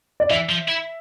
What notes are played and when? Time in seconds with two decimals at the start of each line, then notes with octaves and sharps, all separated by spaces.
0.20 D5
0.30 E3 E5
0.49 F3
0.68 E4